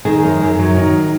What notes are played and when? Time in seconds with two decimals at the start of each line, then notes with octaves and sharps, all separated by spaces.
0.05 D#3 G#4
0.23 F#2
0.41 F#2
0.59 F#3
0.76 D#3